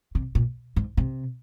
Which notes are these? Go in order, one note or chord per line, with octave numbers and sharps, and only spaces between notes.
C3
A#2
G#2
C3